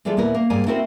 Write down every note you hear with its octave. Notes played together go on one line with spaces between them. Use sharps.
E3 G3 G#3 E4 F4 A4
D#2 A#2 B3 E4 A#4 B4
A#3
G#2 G3 A#3 A#4 G#5
A3 C4 E4 F#4 A#4 C5